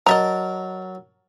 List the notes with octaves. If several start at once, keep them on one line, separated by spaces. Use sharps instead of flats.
F#3 A#4 D#5 E5 A5 A#5